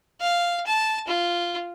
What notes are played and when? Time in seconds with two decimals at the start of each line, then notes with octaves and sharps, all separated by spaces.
0.21 F5
0.66 A5
1.08 F4